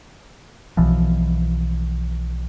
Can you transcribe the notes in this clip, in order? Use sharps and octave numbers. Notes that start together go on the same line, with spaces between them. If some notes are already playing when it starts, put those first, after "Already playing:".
B1 B2 E3 F3